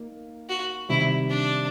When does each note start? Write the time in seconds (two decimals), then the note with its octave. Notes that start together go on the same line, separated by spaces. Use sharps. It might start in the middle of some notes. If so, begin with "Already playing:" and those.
Already playing: A#3 D#4
0.49 F#4
0.89 C3 D#3 G3 E4
1.30 D4